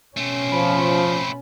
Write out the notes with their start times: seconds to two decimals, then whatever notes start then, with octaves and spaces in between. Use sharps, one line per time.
0.17 B2 A3 C4 C#4
0.52 F3 B5